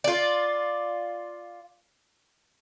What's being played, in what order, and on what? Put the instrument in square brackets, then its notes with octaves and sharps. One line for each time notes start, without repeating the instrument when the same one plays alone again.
[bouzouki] F4 D5